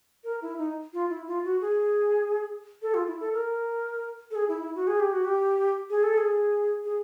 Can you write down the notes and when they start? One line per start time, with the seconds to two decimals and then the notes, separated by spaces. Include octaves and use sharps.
0.24 A#4
0.42 E4
0.58 D#4
0.93 F4
1.10 E4
1.27 F4
1.45 F#4
1.61 G#4
2.82 A4
2.94 F4
3.07 E4
3.20 A4
3.34 A#4
4.31 A4
4.35 G#4
4.48 E4
4.61 E4
4.75 F#4
4.87 G#4
5.00 G4
5.13 F#4
5.25 G4
5.90 G#4
6.03 A4
6.17 G#4
6.85 G#4